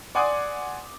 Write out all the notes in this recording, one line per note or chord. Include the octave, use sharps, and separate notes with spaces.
D5 F#5 G#5 C6 D6 D#6